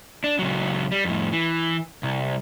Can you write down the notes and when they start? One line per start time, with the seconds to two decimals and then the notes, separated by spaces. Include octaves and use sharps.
0.24 D4
0.39 C#2 F#3
0.92 G3
1.05 F2 A2
1.33 E3
2.03 C2